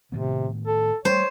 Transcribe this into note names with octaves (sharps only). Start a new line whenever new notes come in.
A2 C3 D#3 B3
A4
G3 A3 C5 C#5